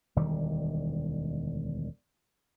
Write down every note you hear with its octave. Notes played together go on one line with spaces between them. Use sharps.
E1 D2 D#3 G3